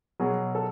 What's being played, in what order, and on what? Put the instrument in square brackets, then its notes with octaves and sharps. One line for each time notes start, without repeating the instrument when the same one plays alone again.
[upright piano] B2 F#3 G#4
A4